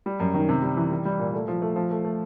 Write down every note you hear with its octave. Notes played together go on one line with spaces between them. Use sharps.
G3
F#2
D#3
C3
G3
E3
G3
G3
A#2
A3
F3
A3
F3
A3
A3